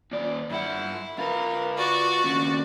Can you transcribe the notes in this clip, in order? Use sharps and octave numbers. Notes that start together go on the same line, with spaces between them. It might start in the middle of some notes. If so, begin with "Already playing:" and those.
D#2 D5
G2 E4 F#5
F4 A#4 B4
F#4 D5
D#2 C#3